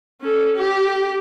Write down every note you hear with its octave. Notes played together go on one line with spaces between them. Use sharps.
C#4 A4
G4